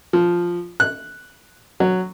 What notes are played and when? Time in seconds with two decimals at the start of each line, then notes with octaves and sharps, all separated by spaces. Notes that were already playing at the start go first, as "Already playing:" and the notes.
0.13 F3
0.80 F#6
1.80 F#3